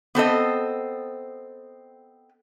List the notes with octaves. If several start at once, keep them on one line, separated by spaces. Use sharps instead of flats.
B3 C4 A4 D#5